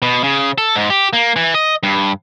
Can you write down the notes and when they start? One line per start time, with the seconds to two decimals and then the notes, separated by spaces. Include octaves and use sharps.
0.02 B2
0.24 C#3
0.58 A4
0.76 G#2
0.90 G4
1.13 A#3
1.36 E3
1.54 D#5
1.83 G2